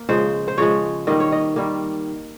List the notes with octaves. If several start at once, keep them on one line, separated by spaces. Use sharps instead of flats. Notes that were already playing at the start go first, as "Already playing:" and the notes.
Already playing: A#3
C#3 F3 G#3 C5
C5
C#3 F3 G#3 C#5
D#3 G3 A#3 D#5
C#5
D#5
D#3 G3 A#3